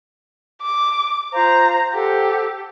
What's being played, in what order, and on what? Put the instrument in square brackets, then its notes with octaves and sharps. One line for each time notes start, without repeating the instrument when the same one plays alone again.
[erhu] D6
[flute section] F4 C5 F5 [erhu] A#5
[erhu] G4 [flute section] A4 C5 F#5